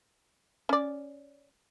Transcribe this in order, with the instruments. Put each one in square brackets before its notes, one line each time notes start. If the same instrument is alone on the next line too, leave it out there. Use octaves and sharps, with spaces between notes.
[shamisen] C#4 D5